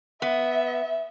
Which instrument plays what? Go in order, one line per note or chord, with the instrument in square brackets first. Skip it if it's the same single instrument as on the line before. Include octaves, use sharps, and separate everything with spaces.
[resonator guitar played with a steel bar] B3 [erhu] E5